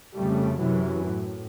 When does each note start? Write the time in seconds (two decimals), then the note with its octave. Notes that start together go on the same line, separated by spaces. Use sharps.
0.15 F2 C#3 G3 A3
0.59 F#2 C3 E3 F#3
1.05 A2